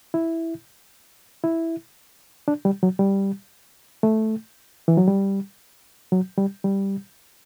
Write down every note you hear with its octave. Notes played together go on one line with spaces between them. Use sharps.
E4
E4
D4
G3
F#3
G3
A3
E3
F#3
G3
F#3
G3
G3